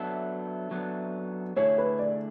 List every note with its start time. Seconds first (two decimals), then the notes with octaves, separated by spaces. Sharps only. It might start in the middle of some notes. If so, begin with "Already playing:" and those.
Already playing: F#3 B3 D4 A4 E5
0.71 F#3 B3 D4 A4
1.56 D3 A3 E4 G#4 C#5
1.78 B4
1.99 D5